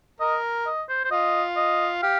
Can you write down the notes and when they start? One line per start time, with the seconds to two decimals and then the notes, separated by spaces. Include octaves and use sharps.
0.20 A#4 D#5
0.66 D#5
0.89 C5
1.05 C5
1.11 F4 D#5
1.56 D#5
2.02 G4 F5